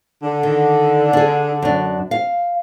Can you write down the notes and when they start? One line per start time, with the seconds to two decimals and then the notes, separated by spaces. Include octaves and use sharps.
0.23 D3
0.43 D#3
1.13 D4 G#4
1.62 F#2 D4
2.11 F5